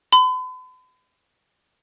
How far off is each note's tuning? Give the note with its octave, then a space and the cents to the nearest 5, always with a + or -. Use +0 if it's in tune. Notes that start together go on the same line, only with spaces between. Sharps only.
B5 +45